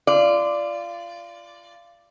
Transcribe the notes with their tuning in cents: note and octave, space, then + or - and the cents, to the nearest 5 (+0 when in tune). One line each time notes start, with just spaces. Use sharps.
F4 -25 D5 +0